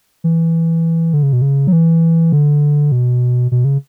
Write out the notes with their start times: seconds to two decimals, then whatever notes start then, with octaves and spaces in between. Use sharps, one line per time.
0.24 E3
1.13 D3
1.23 C#3
1.33 B2
1.42 C#3
1.67 F#3
1.72 E3
2.32 D3
2.92 B2
3.52 B2
3.65 C#3